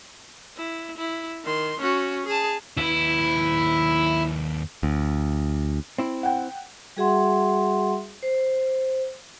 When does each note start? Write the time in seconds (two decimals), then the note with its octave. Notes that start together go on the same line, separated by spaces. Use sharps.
0.57 E4
0.97 E4
1.44 D#3 C6
1.80 C#4 F#4
2.26 G#4 A5
2.77 D#2 E4 B4
4.83 D2
5.98 C4 E4
6.23 F#5 G5
6.97 G3 F#4 G#4 E5 F#5 C6
8.23 C5